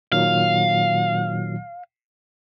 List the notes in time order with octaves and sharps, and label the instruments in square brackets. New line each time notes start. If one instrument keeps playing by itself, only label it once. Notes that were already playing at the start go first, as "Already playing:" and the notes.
[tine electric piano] A#2 D#3 F#3 [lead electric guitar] F5